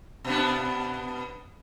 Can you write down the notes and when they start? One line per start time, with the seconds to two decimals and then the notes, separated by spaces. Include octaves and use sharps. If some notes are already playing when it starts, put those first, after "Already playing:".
0.25 B2 B3 D4